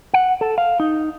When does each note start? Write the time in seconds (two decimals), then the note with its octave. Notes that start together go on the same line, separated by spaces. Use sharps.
0.14 F#5
0.41 A4
0.58 F5
0.80 D#4